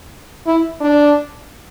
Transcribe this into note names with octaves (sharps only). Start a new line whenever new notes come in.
E4
D4